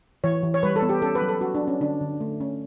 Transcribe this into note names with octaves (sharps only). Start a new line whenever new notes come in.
E3 C#5
E3
C#5
G3 B4
A4
B3
G4
C#4 A4
B4
F#3
A4
C#4 F#4
D4
F#3
C#4
D3 D4
D3
A3
C#4